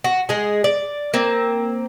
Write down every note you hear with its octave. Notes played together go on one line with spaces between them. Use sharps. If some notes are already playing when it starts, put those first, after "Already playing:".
F#4
G#3 G#4
D5
A#3 C4